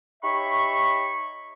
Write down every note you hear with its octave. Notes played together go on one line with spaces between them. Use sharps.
D#4 G4 C#5 E5 B5 C#6